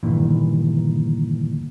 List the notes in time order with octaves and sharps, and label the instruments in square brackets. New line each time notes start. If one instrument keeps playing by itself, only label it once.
[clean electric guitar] D2 G2 A#2 D#3 E3